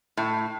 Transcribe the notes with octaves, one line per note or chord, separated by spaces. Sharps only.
A2